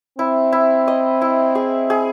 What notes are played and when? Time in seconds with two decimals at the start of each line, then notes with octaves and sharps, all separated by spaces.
0.19 C4 E4
0.52 E4
0.88 D#5
1.22 E4
1.55 G#4
1.90 G#4